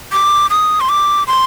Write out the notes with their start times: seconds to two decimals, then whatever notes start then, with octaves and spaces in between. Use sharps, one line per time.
0.12 D6
0.50 D#6
0.80 C6
0.89 D6
1.27 C6